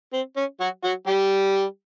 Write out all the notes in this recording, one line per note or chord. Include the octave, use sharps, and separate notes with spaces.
C4
C#4
F#3 F#4
F#3 F#4
G3 G4